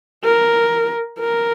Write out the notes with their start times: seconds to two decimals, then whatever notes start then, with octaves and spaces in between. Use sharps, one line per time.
0.24 A#4
1.19 A#4